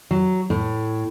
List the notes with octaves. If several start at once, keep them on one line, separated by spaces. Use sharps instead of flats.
F#3
A2